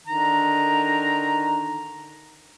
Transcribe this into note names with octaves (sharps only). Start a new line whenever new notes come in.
D3 D#3 A#5